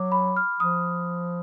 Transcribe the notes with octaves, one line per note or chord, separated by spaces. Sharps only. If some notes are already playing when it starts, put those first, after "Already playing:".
Already playing: F#3 D6
B5
F6
F3 D#6